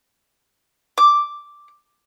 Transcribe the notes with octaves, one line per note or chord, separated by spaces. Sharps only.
D6